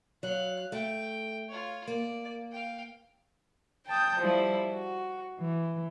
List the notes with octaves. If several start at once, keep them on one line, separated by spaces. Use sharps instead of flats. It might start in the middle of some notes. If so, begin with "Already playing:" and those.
F#3 F5 F#6
A3 G5
F4 C#5
A#3 D5
F5 G5
G5 A5 D#6 G6
F3 G3 E4
F#4
E3